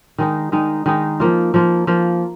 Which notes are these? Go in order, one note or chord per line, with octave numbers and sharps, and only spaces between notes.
D#3 G#3 D#4
D#3 G#3 D#4
D#3 G#3 D#4
F3 A#3 F4
F3 A#3 F4
F3 A#3 F4